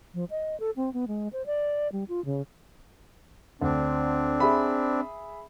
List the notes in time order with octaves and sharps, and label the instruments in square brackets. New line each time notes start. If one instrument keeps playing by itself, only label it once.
[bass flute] F3
D#5
A4
C4
B3
G#3
C5
D5
G3
F4
C#3
[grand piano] D2 [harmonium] C4 D4
[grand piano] G#4 E5 B5